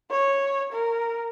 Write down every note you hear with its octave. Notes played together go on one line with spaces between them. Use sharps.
C#5
A#4